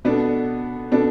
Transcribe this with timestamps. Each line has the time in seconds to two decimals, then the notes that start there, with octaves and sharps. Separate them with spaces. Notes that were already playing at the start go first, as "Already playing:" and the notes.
0.05 B2 B3 D4 A4
0.91 B2 B3 D4 A4